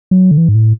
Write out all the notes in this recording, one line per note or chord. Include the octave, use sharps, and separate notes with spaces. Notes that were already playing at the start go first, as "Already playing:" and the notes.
F#3
D3
E3
G#2
A2